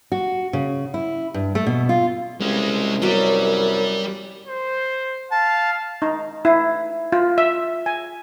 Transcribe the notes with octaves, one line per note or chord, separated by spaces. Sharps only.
F#4
C#3
E4
G2
A3
B2
F4
C2 G#3 C#4
F#2 F#3 G3 B3 F#4
C5
F5 A5
D#4
E4
F4
E5
G#5